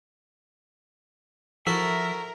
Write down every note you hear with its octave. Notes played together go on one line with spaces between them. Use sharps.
F3 E4 F#4 A4 A#4 E5